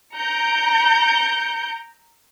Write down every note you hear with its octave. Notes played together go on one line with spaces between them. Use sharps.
A#5 G6 C#7 D7